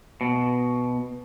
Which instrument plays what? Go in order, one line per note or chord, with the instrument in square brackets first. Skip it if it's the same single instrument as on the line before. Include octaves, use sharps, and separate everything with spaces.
[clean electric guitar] B2